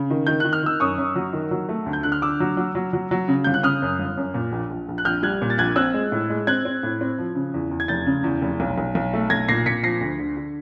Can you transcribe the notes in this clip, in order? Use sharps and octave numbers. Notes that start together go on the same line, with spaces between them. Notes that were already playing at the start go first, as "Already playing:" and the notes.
Already playing: C#3
D#3
D#3 G6
D#3 F#6
F6
D#3 E6
F#2 C#6 D#6
F#2
F#3
D#3
F#3
A3
D2
G6
D3 F#6
F6
D3 D6 E6
F#3
F#3
F#3
F#3
F#3
C#3
G1 G6
F#6
C#3 D#6 F6
F#2
G1
F#2
A#2
A#1
A#1
A#1
F#6
A#1 F6 G6
G3 F#6 G#6
A#2
A6
A#1 F#6 G#6
C4 E6 F#6
G#3
A2
G#3
C4 F#6 G#6
C4
A2
C4
F3
C#3
E2
E2
G#6
F1 G6 A6
C#3
E2
F1
B1
B1
B1
A3
B1 G#6 A#6
A#2 A#6 C7
A#2 B6 C#7
F3 A#6 C7
D2
D3
D3